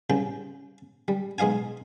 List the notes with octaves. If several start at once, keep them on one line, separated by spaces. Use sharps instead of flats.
C2 C#3 G5
G3
B1 G#3 D#5 F5 G#5